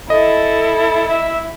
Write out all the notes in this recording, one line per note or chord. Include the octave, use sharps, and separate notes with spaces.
E4 A4 D#5
E5